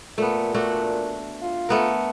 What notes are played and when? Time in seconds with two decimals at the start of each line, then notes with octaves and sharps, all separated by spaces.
0.18 A#2 A3 B3
0.54 A3 D4 F#4
1.42 F4
1.69 A3 B3 A#4